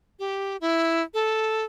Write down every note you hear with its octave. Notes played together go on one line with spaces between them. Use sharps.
G4
E4
A4